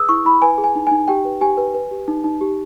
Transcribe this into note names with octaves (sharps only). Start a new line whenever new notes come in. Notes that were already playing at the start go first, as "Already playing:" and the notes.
Already playing: G#4 B4 D#6 E6
E4 C#6
E4 B5
B4 G#5
G#4
G#5
D#4
D#4 G#5
G4 G5
B4
G4 G#5
B4
B4
G4
D#4
D#4
G4